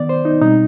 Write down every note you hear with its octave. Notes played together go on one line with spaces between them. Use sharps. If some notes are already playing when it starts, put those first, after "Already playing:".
Already playing: D#3 B3 D5
C5
D#4
B2 G3 C4 D#4